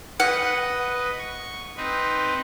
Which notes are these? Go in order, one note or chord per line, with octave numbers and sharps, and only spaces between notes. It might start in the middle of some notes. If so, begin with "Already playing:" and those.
B4 D#5 F#5
C#6
C4 D#4 B4